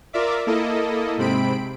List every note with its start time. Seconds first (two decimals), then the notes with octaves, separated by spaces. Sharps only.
0.13 F4 A#4 D5 E5 D6
0.46 A#3 E4 A4 D#5
1.17 G#2 C3 C4 B5 D7